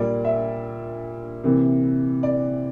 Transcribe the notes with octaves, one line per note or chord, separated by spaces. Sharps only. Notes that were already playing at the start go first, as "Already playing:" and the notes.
Already playing: A#2 G3 A#3 D5
E5
C3 E3 A#3
D5